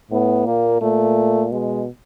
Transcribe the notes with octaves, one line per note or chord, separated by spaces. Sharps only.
A2 B3
A#2 A#3
A#2 A3
B2 G#3